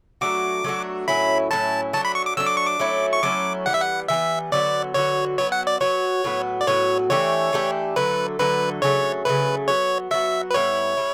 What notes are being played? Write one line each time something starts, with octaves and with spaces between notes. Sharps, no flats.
F#3 A3 D4 F#4 D6
F#3 A3 D4 F#4
A2 F#3 C#4 E4 B5
A2 F#3 C#4 E4 A5
F#3 A3 D4 A5
B5
C#6
D6
F#3 A3 D4 E6
D6
C#6
D6
F#3 A3 C#4 E4
C#6
F#3 A3 C#4 E4 D6
E3 G3 B3 F#5
E5
F#5
E3 G3 B3 E5
D3 F#3 B3 F#4 D5
D3 F#3 B3 F#4 C#5
F#3 B3 F#4 C#5
F#5
D5
F#3 B3 F#4 C#5
A2 F#3 B3 F#4
D5
A2 F#3 B3 F#4 C#5
E3 A3 D4 G4 C#5
E3 A3 D4 G4
D3 F#3 A3 B4
D3 F#3 A3 B4
C#3 F#3 A3 C#5
C#3 F#3 A3 B4
F#3 B3 F#4 C#5
F#3 B3 F#4 E5
B4
A2 G3 B3 E4 C#5
A2 G3 E4